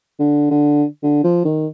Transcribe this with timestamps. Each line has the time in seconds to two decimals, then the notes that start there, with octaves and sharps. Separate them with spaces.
0.19 D3
0.50 D3
1.03 D3
1.24 F3
1.45 D#3